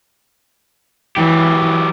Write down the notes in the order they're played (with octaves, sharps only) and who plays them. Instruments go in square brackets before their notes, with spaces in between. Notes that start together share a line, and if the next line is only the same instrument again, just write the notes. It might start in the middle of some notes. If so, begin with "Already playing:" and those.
[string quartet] E3 [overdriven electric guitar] F#3 G4